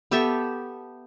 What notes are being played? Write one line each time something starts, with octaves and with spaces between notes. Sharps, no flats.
B3 G4 A4 E5